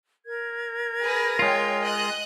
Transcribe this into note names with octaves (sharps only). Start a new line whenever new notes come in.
A#4 G#6
G#4 B4 A#6
G#3 F4 C#5 G5
D#5 F#6